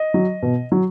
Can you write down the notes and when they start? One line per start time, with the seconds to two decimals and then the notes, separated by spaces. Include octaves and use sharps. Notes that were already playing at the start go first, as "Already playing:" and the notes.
Already playing: D#5
0.14 F#3
0.42 B2
0.72 F#3